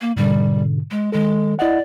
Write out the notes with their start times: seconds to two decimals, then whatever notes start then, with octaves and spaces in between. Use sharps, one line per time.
0.01 A#3
0.17 G#2 B2 D3 G3
0.91 G#3
1.12 D#3 G#3 A4
1.59 E4 D5 D#5 F#5